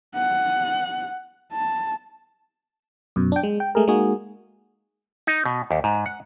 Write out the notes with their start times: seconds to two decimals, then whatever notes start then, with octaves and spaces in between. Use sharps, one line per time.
0.16 F#5
1.52 A5
3.16 F#2 B2
3.32 D4 G5
3.43 G#3
3.60 G5
3.75 G#3 A3 G#4 A#4
3.88 G#3 A#3 D#4 F#4 G#4
5.27 D#4
5.45 B2
5.71 D#2
5.84 G#2
6.06 F#5